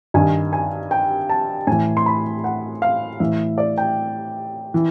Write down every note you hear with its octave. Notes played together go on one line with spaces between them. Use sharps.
G2 D#3 G#5
G#5
G5
A5
A2 E3 G#5
C6
B5
F#5
F5
A2 E3 E5
D5
G5
E3